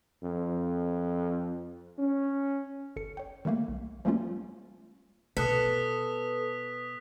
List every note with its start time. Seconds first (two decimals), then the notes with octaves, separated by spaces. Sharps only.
0.22 F2
1.99 C#4
2.96 G1 A4 C#7
3.17 C#5 G5
3.45 D#3 G3 A3 A#3
3.68 B1
4.05 F3 G3 A3 A#3 C#4 F4
5.37 B2 A4 B4 D#6 F#6 B6